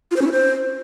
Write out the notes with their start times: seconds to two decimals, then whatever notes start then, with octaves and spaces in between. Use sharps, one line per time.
0.11 F4
0.16 C5
0.21 C#4
0.27 E4
0.32 C5